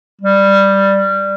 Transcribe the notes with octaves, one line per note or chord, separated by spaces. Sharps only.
G3